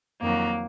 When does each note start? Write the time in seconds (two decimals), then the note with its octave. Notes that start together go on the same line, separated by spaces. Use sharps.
0.22 F2 D#3 F#3 A#3